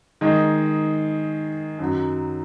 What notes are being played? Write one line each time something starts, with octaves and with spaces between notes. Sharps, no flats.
D#3 G#3 D#4
F#2 D#3 F#3